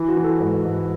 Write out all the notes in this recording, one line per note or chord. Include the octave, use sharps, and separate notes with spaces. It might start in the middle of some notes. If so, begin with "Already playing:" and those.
Already playing: E3 E4
F#4
E3
A4
G#2 B4
G#2